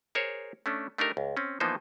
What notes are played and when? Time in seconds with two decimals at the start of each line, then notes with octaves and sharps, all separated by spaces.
0.15 G#4 A#4 C5 C#5
0.66 A3 C#4 D4
0.98 A3 D4 D#4 G4 A#4
1.17 C#2
1.37 C4 C#4
1.60 E3 F3 A#3 B3 D#4 C5